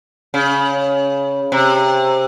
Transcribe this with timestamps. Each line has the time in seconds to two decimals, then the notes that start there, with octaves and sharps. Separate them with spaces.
0.34 C#3
1.52 C3